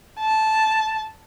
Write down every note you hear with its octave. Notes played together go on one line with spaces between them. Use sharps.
A5